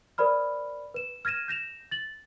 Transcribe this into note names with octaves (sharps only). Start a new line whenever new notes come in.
A#4 C5 D5 B5 F6
B4 E7
F6 G#6 A#6 D#7 E7
G6 A#6 E7 F7
A6 F#7